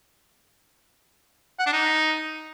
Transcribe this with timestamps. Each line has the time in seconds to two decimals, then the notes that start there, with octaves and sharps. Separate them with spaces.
1.59 F#5
1.66 D4
1.73 D#4